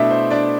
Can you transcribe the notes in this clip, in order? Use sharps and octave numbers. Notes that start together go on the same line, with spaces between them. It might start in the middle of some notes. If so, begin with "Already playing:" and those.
Already playing: B2 A3 D4 E4 E5
C5
D4 D5